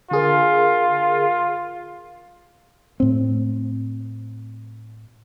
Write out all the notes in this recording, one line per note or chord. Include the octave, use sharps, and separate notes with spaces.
D3 F4 G#4 A#4
A2 C4